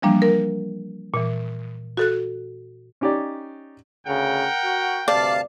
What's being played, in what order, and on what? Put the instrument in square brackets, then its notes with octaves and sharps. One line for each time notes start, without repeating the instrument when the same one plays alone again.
[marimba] E3 F3 G3 A#3 D4
A#4
A#2 E3
F#4 A4 F#6
[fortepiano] C#4 D#4 G4 C#5 D5
[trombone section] D2 C#3 [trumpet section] A#4 F#5 G5
[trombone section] F#4
[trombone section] D2 G2 C3 [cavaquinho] D5 [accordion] F5 A5